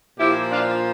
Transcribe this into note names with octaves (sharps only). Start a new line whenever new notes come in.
A#2 F3 E4 G4
D4 F4